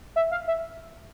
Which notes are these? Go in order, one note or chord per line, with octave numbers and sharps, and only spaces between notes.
E5
F5
E5